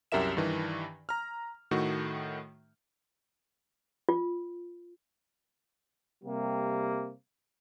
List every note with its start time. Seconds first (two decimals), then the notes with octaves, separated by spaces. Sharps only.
0.12 C2 F#2 G4 A#4 E5 E7
0.37 G2 D#3 E3
1.09 A#5 F6
1.71 A2 D#3 A3 F#4
4.09 F4
6.23 C3 G3 A#3